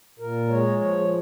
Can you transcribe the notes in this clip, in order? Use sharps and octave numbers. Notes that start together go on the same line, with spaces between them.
A#2 A#4
G#3 C#5
F3 C#5